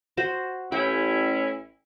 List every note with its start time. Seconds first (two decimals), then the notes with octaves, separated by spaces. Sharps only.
0.17 F#4 C5
0.72 A1 C#4 E4 G5